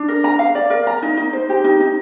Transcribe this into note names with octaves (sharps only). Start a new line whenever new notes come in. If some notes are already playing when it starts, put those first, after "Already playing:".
Already playing: D4
A#4
A#5
F5
D5
A#4
A#5
D#4
D#4
C5
G4
D#4
D#4